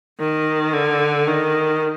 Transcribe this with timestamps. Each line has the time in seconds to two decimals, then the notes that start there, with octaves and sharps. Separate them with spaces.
0.20 D#3
0.73 D3
1.27 D#3